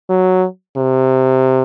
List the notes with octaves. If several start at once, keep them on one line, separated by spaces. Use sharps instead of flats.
F#3
C3